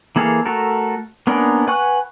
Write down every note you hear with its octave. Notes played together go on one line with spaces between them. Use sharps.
E3 A#3 G#4 A4 F5
A3 F#4 A4 A#4
A#3 B3 C#4 D4 A#4
B4 F#5 G#5 C#6 F#6